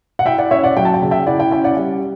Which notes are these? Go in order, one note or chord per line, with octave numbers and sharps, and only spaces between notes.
F#5
E4 E5 G5
D5 F#5
C#4 C#5 E5
D5 F#5
F#3 G5
A5
G5
C#3 A5
E5 G5
E4 D5 F#5
E5 G5
C#4 E5 G5
D5 F#5
G3